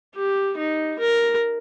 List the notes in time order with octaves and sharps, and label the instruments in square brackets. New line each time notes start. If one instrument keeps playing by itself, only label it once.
[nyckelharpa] G4
D#4
A#4